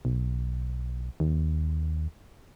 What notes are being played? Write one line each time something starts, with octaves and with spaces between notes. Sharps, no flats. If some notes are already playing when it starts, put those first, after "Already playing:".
B1
D#2